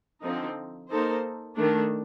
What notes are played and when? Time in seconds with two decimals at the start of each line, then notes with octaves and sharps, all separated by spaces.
0.22 D3 F3 C4 D#4
0.89 A#3 D#4 A4 C5
1.55 D#3 A3 D4